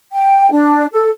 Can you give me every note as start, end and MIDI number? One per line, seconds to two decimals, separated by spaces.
0.12 0.49 79
0.51 0.86 62
0.92 1.08 69